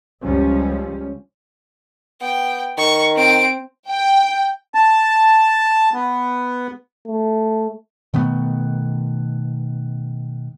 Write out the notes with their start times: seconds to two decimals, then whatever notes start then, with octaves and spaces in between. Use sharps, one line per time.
0.22 C#2 F3 G3 C#4
2.21 B3 G5
2.78 D#3 C#6
3.16 C4 D7
3.90 G5
4.74 A5
5.94 B3
7.07 A3
8.14 B2 D#3 A3 B3